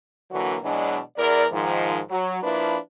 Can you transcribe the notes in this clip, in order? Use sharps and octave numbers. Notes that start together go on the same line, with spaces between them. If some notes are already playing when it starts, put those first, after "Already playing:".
D3 E3 F#3 A#3 D4 F#4
B2 E3 F#3 G#3 D4
E2 A#4 D5
G#2 D#3 F3
F#3
F3 A#3 D4 E4 B4